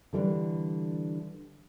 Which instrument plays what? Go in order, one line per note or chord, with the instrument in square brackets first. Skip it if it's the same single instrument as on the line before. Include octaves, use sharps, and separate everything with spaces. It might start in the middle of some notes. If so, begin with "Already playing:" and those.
[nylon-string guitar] D3 E3 G3